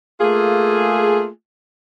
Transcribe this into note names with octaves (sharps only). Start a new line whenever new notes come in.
A3 A#3 F4 G#4